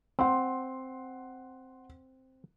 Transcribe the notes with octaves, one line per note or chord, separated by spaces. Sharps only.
C4 F#5 C6